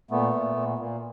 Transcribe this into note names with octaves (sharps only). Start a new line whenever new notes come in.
A#2 A3 B3
A#2
A#2
A#2